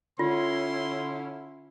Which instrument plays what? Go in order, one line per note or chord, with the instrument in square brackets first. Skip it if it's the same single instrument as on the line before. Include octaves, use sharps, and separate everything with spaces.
[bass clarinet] D3 [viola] C#4 E4 [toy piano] F4 [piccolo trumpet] C6